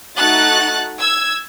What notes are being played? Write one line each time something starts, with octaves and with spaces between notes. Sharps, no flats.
A3 D#4 F#4 F#6 A6
E6 G#6